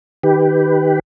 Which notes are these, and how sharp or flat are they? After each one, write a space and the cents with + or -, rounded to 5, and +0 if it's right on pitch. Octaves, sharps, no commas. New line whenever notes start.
D#3 +0 G4 +0 B4 +5